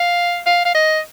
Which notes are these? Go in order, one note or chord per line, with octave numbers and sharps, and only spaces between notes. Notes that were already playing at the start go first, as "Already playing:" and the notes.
Already playing: F5
F5
F5
D#5